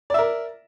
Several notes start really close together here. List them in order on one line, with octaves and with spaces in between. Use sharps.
D5 E5 A#4